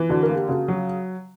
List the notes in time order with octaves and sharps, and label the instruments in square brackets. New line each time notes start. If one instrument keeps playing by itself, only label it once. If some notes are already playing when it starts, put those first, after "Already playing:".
Already playing: [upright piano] E3
[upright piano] D3 [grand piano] F#4
[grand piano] A#4
[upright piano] A#3
[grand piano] G4
[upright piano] C#3 [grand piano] F#4
[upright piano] F#3